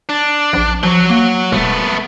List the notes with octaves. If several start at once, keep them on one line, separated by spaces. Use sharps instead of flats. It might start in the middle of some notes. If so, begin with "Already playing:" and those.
D4
A#1
F3 F#3 F#4
A#3
E1 A3 B3